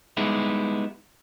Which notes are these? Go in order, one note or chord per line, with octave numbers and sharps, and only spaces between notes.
G3 G#3 B3 D#4 E4